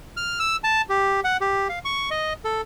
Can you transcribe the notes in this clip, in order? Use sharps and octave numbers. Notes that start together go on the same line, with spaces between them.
F6
E6
A5
G4
F#5
G4
F5
C#6
D#5
A4